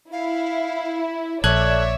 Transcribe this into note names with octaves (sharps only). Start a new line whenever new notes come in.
E4 F5
A#1 A4 C#5 D5 E5 F#6 G#6